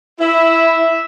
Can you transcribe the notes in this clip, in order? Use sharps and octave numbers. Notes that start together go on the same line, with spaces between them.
E4 E5